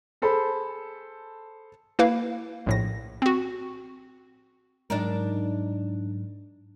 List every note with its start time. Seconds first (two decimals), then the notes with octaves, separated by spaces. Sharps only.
0.22 G#4 A4 C5 A5 B5
1.99 A#3 E4 B4 F5
2.66 A#1 A2 A#6
3.22 C4 F#4
4.90 G#2 F#3 D4 D#4 A#4